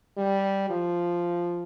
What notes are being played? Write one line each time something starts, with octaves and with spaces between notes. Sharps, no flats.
G3
F3